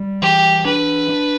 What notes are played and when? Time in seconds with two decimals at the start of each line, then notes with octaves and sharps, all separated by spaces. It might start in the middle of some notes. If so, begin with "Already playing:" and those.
Already playing: G3
0.21 E3 G4
0.65 D4 B4
1.09 D4